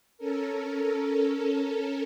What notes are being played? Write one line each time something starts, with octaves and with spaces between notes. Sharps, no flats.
C#4 A4 A#4